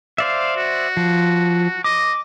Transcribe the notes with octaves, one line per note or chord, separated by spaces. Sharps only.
C5 D5 E5 F5
F#4
F3
D#5 D6